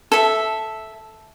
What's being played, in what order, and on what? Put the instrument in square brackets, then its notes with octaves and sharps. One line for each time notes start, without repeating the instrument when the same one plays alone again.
[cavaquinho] A4 E5